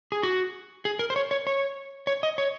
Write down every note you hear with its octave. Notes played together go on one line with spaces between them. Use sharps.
G#4
F#4
G#4
A#4
C5
C#5
C#5
C#5
C#5
D#5
C#5